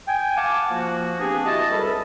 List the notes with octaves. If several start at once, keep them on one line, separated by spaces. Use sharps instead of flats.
G5 G#5
F5 F#5 G#5 A5 D6
F3 A#3 F#4
B3 C4 D4 G4 G#4
E4 F#4 D#5 A5
C#2 G3 A4 A#4 D#5 B5